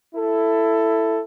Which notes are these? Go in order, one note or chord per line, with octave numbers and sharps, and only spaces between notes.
E4 A4